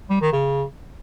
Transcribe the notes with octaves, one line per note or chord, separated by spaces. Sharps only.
G3
D#3
C#3